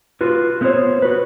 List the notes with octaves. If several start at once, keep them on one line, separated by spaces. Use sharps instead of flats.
F4 F#4 B4
A3 B3 F4 F#4 C5 C#5
F#4 B4